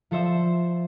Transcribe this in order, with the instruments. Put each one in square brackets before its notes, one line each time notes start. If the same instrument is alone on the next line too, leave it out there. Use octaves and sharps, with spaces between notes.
[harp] F3 A4 C5 E5 E7